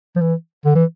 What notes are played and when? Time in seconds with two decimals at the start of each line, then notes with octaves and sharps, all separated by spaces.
0.16 F3
0.21 E3
0.65 D3
0.75 E3